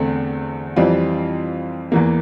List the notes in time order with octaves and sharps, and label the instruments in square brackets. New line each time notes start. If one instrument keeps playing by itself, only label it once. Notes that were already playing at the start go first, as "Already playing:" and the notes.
Already playing: [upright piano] E2 D3 A3 C4
F2 E3 G3 C4 F4
E2 E3 A#3